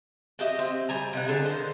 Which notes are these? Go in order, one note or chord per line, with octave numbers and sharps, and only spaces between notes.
F#4 G4 D#5 E5
C4
G3 G#5 A#5
C3 D#4 F#5
D3 G#4
D#3 C5